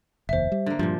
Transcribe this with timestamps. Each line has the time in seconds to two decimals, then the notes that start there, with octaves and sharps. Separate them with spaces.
0.29 F1 D#2 C5 E5
0.52 G3
0.66 D3 A#3
0.79 G2 A#2 F3